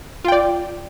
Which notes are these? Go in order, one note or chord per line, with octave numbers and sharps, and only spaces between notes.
F4 D5 G5